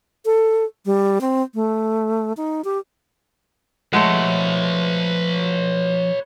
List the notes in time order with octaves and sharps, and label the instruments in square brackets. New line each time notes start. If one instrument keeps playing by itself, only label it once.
[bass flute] A4
G3
C4
A3
D#4
G4
[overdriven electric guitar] F3 F#5 [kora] G#3 A3 [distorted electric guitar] B4 C#5